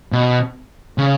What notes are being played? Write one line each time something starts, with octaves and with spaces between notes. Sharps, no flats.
B2
C#3